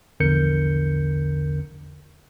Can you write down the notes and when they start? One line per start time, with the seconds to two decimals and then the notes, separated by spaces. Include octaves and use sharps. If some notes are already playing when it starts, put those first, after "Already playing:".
0.20 A#1 E2 D3 A#4 G6 C#7